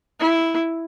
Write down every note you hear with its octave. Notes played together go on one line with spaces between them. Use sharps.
E4